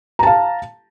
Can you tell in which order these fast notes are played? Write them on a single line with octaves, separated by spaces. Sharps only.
A#5 A5 F5